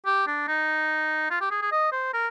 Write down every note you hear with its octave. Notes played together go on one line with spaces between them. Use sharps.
G4
D4
D#4
F4
G4
G#4
G#4
D#5
C5
A#4